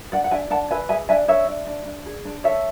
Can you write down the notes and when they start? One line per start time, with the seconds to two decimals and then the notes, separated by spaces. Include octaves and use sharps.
0.12 D4 D5 F#5
0.24 F#5
0.31 D4 E5 G#5
0.50 D4 F#5 A5
0.71 B4 E5 G#5
0.89 G#4 E5 G#5
1.09 D4 E5 G#5
1.28 D4 C#5 E5
1.48 D4
1.67 D4
1.86 D4
2.06 G#4
2.25 D4
2.44 A4 C#5 E5